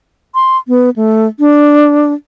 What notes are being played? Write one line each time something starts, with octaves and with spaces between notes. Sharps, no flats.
C6
B3
A3
D4